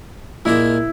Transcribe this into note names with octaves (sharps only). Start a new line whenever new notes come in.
A#2 G#3 A#3 E4